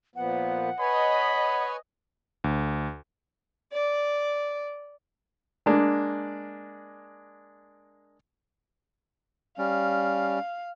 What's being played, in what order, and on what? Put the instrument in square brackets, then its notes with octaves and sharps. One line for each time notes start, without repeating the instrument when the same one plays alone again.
[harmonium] A#2 F3 B3 [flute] F#5
[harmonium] B4 C#5 G#5 [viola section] D#5 [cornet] B5
[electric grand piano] D2
[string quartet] D5
[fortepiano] G#3 A#3 D4
[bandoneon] G3 C#4 [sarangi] F5